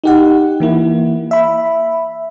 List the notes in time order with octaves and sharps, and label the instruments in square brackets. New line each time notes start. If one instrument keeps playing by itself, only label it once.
[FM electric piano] D#4 G4 F#5
E3 A#3 E4
E5 B5